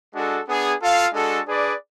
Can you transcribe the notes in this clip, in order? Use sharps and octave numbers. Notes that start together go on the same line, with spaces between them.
G#3 D4 F#4 A4
B3 D4 G#4
F4 A4 F5
G#3 D4 F#4 A4
D4 G#4 B4 D5